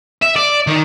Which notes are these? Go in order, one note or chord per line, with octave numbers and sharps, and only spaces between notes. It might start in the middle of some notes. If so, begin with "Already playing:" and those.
E5
D5
D#3